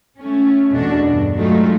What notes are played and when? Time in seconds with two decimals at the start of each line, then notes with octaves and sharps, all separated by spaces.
0.19 A3 C#4
0.71 E2 B2 A3 D4 F#4
1.06 G2
1.36 F#3 G#3 A3 D#4 F4 F#4